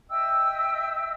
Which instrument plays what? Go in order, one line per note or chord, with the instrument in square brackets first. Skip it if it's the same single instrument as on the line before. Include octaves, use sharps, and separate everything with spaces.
[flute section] D#5 E5 G5 E6